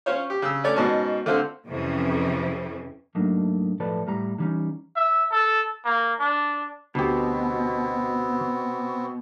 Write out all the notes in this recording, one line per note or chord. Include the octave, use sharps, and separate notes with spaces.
C#4 F4 C5 C#5
G4
C#3 E6
A3 C#4 C#5 D5
G#2 B2 C#4 A5
D3 A3 C4 F4 C5 F5
F2 C3 E3 C4 C#4
G#2 F#3 A3 A#3 D4 D#4
B1 A2 F3 A4 B4 D5
A2 G3 A#5
D3 E3 G3 C4 C#4 D#4
E5
A4
A#3
D4
D2 B2 B3 C4 G4